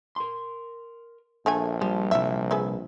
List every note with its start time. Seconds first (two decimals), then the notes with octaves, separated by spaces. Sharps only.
0.16 A#4 C6
1.46 A#1 D3 A3 G#5
1.81 F3 G3
2.11 C2 F#2 E4 E5
2.51 G#4 B4 E5